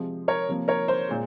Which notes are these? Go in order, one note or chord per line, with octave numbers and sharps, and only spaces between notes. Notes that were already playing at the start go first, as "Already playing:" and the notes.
Already playing: C3 F3 G#3
A#4 C#5
C3 F3 A#3
A#4 C#5
C5
A#2 G#3